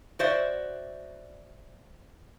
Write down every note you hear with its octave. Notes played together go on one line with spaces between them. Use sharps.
F#4 C5 D5 E5